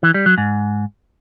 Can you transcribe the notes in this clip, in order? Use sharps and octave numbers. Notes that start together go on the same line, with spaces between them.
E3
G3
F#3
G#2